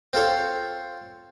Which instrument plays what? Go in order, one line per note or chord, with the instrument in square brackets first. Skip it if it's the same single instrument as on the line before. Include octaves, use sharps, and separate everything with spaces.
[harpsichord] C4 F4 A4 C#5